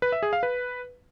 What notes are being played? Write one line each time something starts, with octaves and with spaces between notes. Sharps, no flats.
B4
E5
G#4
F5
B4